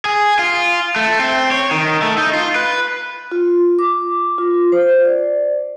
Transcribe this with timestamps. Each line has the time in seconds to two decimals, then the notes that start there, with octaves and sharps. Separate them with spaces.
0.05 G#4
0.39 F4
0.96 A3
1.20 C4
1.52 C#5
1.71 D#3
2.02 A3
2.18 D#4
2.33 F4
2.55 B4
3.32 F4
3.79 D6
4.38 F4
4.72 C5
5.05 D5